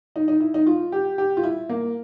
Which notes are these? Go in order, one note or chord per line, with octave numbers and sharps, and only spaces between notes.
D#4
D#4
E4
D#4
F4
G4
G4
F4
E4
A#3